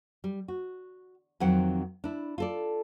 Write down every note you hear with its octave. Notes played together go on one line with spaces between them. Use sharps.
G3
F#4
F2 D#3 F#3 C4 F#5 G5
D4 E4
F4 A4 D5